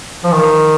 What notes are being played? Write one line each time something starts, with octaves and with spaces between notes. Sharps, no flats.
F3
D#3